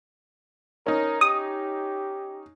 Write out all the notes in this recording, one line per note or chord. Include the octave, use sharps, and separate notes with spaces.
C#4 D#4 A#4
G4 D#6